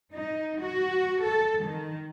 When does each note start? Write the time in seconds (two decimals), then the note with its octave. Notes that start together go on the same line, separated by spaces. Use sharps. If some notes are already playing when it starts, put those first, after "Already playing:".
0.14 D#4
0.60 F#4
1.22 A4
1.60 D#3